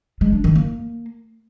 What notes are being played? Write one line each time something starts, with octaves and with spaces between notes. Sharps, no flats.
G#3
D4
D#3
A#3